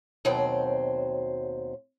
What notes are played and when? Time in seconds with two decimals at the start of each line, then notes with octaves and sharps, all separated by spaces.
0.25 D#2 B2 F#3 C4 C5 G5